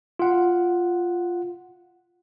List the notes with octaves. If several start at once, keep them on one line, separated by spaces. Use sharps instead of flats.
F4 F#5